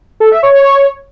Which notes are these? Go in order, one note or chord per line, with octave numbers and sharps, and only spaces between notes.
A4
E5
C#5